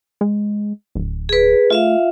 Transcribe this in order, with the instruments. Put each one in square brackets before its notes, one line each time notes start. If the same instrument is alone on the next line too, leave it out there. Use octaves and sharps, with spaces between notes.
[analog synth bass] G#3
D1
[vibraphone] G#4 B4
[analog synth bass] A3 [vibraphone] F4 E5 F5